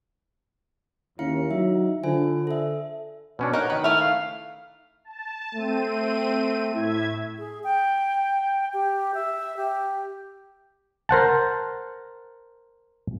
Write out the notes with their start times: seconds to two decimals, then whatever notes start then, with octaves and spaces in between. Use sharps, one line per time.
1.19 D#2 C#4 E4 F5 C#7
1.51 F#3 D#4 E5
2.04 D3 F4 C5 G#5
2.47 A4 E5
3.39 B2 C#4 D4 C#5
3.53 D#4 F#4 A#4 F#5
3.70 D#3 B4 F#5
3.84 A3 E4 F6
4.01 F5
5.05 A5
5.55 A3 C4 D#7
6.75 A2 E4 E5 G#6
7.38 G#4
7.64 G5
8.73 G4
9.14 E5
9.57 G4
11.09 A#4 C5 F#5 A5